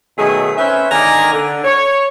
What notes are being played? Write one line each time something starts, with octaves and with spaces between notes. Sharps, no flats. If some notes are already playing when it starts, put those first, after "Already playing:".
B2 D#3 F#3 A3 G#4
C4 C#4 B4 C5 E5
D3 D#3 A#3 D5 G#5 A#5
D3
C#5